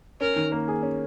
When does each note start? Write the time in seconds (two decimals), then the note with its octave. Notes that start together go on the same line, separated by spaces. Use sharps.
0.21 C#4 A#4
0.36 D#3
0.52 A#3
0.68 G#4
0.83 C#4